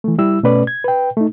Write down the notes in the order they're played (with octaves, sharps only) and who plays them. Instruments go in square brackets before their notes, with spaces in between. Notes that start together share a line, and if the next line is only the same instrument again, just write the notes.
[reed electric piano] E3 A3
G3 E4 E6
B2 A3 C#4 B4 D5
G#6
B4 G5
A3 D#4